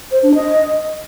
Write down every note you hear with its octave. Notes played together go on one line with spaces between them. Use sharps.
C5
D4
D#5